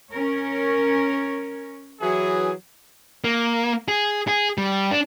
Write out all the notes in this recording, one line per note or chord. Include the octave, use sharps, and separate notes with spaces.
C#4 A#4 C#5
E3 F#3 G#4
A#3
G#4
G#4
G3
D4